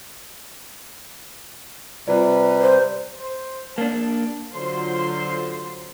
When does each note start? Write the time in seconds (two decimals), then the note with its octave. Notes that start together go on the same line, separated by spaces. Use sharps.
2.08 C3 G3 F4 B4 D5
2.61 C5 D5
3.20 C5
3.78 A#3 D4 A5
4.54 D3 F#3 F4 C5 C6